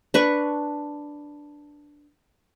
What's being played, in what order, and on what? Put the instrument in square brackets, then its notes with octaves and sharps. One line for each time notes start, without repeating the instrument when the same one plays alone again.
[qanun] D4 B4 C#6